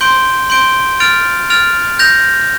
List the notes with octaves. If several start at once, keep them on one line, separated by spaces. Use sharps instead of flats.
C6 G6 D7 G7
C6 G6 D7 G7
F6 A6 D7 F7
F6 A6 D7 F7
G6 A#6 F7